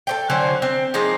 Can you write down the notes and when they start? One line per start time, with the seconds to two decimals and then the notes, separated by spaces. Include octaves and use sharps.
0.07 A4 C5 G5
0.30 D3 F#3 C#4 C5
0.62 C4
0.94 F3 G#3 A#3 D#4